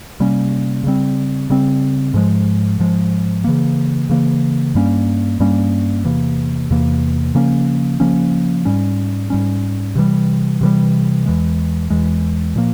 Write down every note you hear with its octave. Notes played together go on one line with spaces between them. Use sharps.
C3 G3 A#3 C#4
C#3 G3 C4
C#3 G3 C4
G#2 F3 G#3
G#2 F3 G#3
C#3 E3 A#3
C#3 E3 A#3
G2 G3 A#3 C#4
G2 G3 A#3 C#4
E2 C3 E3 A#3
E2 C3 E3 A#3
C#3 F3 A#3 C#4
C#3 F3 A#3 C#4
G#2 G3 C#4
G#2 G3 C#4
C3 E3 G3
C3 E3 G3
E2 E3 G#3
E2 E3 G#3
A#2 F3 A#3